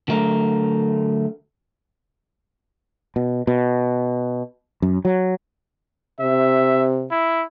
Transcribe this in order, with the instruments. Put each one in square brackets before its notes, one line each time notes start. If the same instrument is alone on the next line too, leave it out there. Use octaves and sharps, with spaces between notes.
[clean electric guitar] D3 F#3 A3 A#4
[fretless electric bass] B2
B2
F#2
F#3
[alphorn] C3 [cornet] E5
[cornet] E4